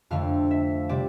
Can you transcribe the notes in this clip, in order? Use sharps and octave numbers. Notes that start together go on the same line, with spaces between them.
F2 D3 A3 C4 F5
E5
C3 G3 C4 D5